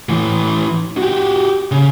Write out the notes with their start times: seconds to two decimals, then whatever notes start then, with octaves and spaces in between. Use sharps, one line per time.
0.09 A2 E3
0.98 F#4 G4
1.72 C#3